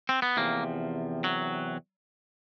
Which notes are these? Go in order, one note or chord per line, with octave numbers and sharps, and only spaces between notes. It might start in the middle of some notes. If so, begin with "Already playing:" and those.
C4
B3
E2 C3 F3 A#3
F#3